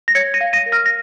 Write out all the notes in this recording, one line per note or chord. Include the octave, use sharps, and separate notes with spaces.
A#6
C#5 G#6 C#7
A#6 D#7
F5
A#6 D#7
A#4
F6 A#6
A#6